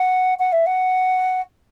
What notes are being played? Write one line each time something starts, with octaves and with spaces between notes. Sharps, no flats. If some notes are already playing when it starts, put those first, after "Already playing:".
Already playing: F#5
F#5
E5
F#5